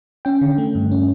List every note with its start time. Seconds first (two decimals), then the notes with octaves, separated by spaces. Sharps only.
0.25 C#4 G5
0.41 D3
0.58 A3
0.75 G2
0.92 C#4